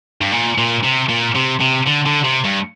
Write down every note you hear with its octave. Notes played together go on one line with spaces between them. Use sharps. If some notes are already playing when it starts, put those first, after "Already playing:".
G2
A#2
A#2
C3
A#2
C3
C3
D3
D3
C3
G2